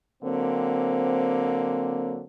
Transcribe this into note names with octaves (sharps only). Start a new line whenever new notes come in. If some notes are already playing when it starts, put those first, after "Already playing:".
D3 F#3 A#3 C4